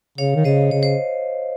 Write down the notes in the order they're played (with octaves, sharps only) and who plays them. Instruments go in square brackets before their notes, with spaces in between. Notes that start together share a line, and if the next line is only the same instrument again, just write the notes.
[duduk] C#3 [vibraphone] C#5 F5
[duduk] D#3
[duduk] C#3 [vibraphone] C5 D#5
[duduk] C#3 [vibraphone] C#5
[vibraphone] C5